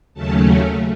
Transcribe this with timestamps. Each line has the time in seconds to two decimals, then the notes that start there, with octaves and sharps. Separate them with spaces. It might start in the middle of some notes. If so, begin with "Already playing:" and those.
0.14 D#2 C#3 F#3 A3 C#4 A5